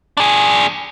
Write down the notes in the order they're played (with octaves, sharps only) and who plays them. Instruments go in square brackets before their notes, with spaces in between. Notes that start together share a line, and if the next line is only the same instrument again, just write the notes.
[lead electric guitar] D4 G#4